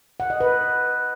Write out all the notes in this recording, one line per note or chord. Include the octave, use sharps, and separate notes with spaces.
F#5
D#5
B4